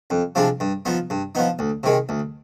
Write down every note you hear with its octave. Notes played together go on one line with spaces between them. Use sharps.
F2
C3 F3 G#3 D4
G2
F3 B3 D#4
G2
F3 B3 D#4
D2
C3 D#3 G#3
D2